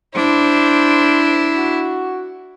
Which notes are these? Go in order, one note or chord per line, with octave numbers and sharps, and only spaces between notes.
D4 E4 C5
F#4